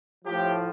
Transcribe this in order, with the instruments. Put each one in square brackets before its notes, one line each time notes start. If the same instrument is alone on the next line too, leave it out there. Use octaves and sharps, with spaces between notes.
[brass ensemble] A2 F3 G4